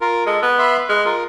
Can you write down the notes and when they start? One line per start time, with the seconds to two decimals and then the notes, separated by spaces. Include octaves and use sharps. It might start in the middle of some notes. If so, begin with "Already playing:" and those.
0.01 F4 A#4
0.27 G#3 A4
0.43 B3
0.59 E5 B5 C6
0.89 G#3 F6 F#6
1.06 F4 A#4